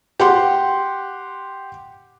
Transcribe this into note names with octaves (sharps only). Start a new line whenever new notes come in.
G4 F#5 C6